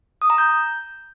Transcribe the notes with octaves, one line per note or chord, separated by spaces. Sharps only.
D#6
A#5
G6